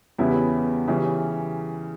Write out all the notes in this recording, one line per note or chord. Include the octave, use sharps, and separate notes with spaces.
E2 C#3 G3 B3 E4
C#3 E3 G3 C#4